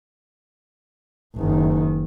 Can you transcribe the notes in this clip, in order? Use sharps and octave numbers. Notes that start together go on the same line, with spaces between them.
F#1 D#3